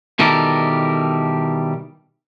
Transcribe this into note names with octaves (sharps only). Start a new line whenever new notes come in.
B2 D#3 E3 G3 A4 A#4